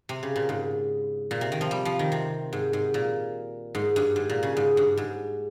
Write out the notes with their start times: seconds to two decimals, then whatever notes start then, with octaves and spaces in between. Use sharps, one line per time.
0.09 C3
0.23 C#3
0.36 A#2
0.49 G#2
1.31 A#2
1.41 C3
1.52 D#3
1.61 F3
1.71 G3
1.85 F3
1.99 D#3
2.12 C3
2.53 G#2
2.73 G#2
2.94 A#2
3.75 G#2
3.96 G2
4.16 G#2
4.30 A#2
4.43 C#3
4.57 G#2
4.77 G2
4.97 G#2